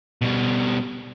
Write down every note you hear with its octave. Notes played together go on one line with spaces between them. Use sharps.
B2 G3